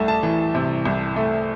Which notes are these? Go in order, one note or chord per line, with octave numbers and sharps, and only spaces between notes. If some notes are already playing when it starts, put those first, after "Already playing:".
Already playing: C2 A3
A5
E3
C3
C2
A3